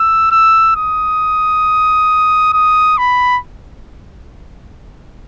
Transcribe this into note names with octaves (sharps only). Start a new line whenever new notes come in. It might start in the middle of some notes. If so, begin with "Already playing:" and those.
Already playing: E6
E6
D#6
D#6
B5